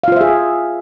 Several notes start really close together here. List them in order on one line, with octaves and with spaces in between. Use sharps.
F5 F4 C5 E5 G#4